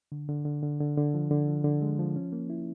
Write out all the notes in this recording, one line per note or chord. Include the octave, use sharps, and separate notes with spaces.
D3
D3
D3
D3
D3
D3
F3
D3
F3
D3
G#3
F3
C#4
A#3
E4